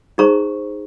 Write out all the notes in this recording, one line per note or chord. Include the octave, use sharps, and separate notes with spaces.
D#4 G#4 C5 A#5 C#6